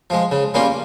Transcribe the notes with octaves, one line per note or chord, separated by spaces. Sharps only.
F3 G#3
C#3
G3 A#3 C#4 F4